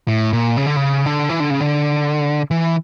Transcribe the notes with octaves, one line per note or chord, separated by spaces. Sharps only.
A2
A#2
C#3
D3
C#3
D3
E3
D3
C#3
D3
E3